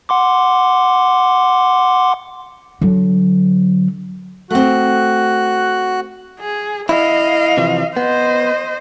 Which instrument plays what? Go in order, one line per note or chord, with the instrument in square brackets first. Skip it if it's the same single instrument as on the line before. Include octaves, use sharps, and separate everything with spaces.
[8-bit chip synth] F#5 C6 D6
[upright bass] D3 F#3
[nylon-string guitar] A3 C4 [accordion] F#4 F#6
[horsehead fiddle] G#4
[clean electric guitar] E4 [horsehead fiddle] D#5 F5
[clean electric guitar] C3 E3 F3
[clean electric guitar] B3 [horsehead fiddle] C5 D#5